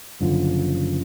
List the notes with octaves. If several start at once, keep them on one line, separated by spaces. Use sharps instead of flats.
F#1 F#2 D3 F3